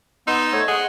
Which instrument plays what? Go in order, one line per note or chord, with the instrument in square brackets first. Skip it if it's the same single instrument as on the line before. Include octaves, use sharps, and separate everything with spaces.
[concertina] B3 C6 E6 [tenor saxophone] D#4
[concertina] A3 C5 C#5
[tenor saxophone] G#3 [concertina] F#5